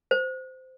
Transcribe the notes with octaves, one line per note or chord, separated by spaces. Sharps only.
C5